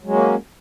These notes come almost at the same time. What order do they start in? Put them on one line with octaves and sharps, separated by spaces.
F#3 G#3 C#4 A#3